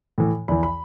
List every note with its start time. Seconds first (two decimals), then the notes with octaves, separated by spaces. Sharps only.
0.18 A2 E3
0.48 E2 E3 B5
0.63 B5